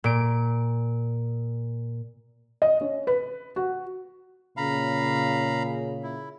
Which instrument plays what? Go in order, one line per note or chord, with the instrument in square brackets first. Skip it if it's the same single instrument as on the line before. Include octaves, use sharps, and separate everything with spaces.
[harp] A#2 D7
[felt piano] D#5
C#4
B4
F#4
[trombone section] A#2 C#3 [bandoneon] F5 A#5 B5
[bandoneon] E4